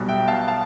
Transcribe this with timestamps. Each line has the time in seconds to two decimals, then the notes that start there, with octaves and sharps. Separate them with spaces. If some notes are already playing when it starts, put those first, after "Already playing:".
Already playing: B1 B2 G3
0.09 E5 G5
0.28 F5 A5
0.48 F5 A5